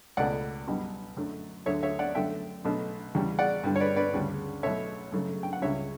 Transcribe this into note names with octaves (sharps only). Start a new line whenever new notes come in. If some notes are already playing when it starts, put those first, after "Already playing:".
C#2 B2 A3 D5 F#5
B1 B2 G3
F#2 D3 F#3 A3
D2 D3 F#3 A3 C#5 E5
C#5 E5
D5 F#5
F#2 D3 A3 E5 G5
B1 B2 F#3 A3
E2 C#3 G3
D5 F#5
G2 D3 G3
C#5
B4 D5
B4 D5
D2 C#3 G3
B1 B2 A3 C#5 E5
F#2 C#3 F#3 A3
G5
F#5
C#2 C#3 G3 C#5 E5